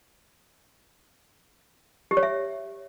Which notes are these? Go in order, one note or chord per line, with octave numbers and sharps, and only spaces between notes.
G4
C#5
E5